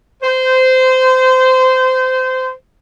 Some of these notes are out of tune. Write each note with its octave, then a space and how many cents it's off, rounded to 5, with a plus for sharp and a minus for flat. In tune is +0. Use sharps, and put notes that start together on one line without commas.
C5 -20